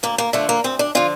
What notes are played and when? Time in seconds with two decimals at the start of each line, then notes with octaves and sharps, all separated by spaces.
0.03 D2 A#3
0.18 A#3
0.33 D3 F3 A3
0.49 A#3
0.64 D2 C4
0.79 D4
0.95 D3 F3 F4